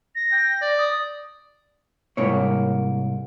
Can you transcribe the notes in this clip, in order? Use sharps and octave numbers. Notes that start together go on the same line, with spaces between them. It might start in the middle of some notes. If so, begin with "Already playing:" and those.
A#6
G5
D5
D#6
C2 G#2 A#3 C#5